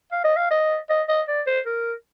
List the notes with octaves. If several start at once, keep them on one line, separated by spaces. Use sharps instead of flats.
F5
D#5
F5
D#5
D#5
D#5
D5
C5
A#4